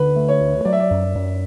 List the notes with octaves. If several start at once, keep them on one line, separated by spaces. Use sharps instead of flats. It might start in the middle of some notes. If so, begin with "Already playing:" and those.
Already playing: D2 D3 B4
A3
C#5
D2
F#3 D5
E5
D5
F#2
F#2